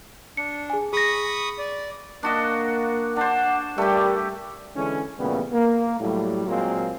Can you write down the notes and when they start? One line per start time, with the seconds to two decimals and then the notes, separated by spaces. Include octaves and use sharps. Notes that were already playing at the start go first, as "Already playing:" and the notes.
0.37 D4 C#7
0.70 G#4 G#5
0.93 G#4 B5 C#6 D#6 A#6
1.58 D5
2.23 A#3 D4 F#4 D#5
3.16 D4 C5 F#5
3.78 G3 A3 G4 A#4
4.76 D3 E3 G#3 C#4
5.19 A#2 C#3 E3 G3 A3 B3
5.53 A#3
6.00 A2 F#3 G3
6.47 A#2 F#3 G#3 A#3 C4 F4